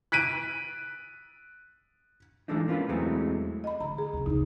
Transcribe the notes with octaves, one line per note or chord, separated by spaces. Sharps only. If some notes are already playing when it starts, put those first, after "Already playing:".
F#6 B6 D7 D#7
E3 F3 G#3 A3 D4 D#4
A#3 C#4 F4 A#4 B4
E2 E3 F#3 G#3 A3 C4
D#5 B5
D3 A#5
G#4
C3 B3
C#2 C3 D#4